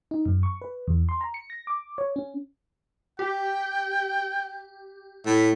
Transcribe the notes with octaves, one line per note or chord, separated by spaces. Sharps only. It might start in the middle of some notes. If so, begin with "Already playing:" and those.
D#4
F#2
C#6
B4
E2
C6
A#5
C#7
A#6
D6
C#5
C#4
G4 G5
A2 E5